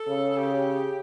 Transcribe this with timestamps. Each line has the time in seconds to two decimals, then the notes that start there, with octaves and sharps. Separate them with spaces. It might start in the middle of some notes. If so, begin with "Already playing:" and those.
Already playing: A4
0.08 C#3
0.37 G4